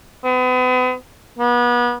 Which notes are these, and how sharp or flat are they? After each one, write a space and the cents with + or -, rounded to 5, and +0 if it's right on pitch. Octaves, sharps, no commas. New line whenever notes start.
B3 +40
B3 -35